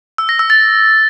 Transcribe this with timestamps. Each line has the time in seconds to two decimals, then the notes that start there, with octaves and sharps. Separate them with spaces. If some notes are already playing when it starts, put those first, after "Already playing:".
0.18 E6
0.29 A#6
0.39 E6
0.50 A6